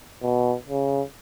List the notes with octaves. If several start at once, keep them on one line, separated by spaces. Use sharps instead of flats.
B2
C#3